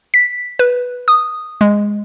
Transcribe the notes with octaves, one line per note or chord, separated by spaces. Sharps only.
B6
B4
D#6
G#3